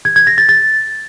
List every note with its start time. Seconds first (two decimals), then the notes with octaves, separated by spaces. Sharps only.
0.05 G#6
0.16 G#6
0.27 A#6
0.38 A6
0.49 A6